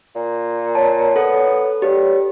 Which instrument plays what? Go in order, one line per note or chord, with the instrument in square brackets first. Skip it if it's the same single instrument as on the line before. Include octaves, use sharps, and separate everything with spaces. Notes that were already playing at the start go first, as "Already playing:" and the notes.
[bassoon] A#2
[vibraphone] C#5 [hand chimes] A5
[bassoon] B3 [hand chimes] A4
[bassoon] G2 [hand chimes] G4 [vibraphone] C#5